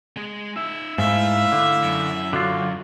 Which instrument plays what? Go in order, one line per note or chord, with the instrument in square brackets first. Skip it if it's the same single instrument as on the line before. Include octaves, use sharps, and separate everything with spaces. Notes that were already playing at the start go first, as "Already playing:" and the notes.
[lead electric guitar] G#3 G#4
[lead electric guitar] D#4 E5 [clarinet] E6
[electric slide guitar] G#2 [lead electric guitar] A3 [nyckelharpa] E4 E5 [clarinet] F5
[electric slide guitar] D3
[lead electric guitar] F#2
[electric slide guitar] D3 F4 [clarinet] F#4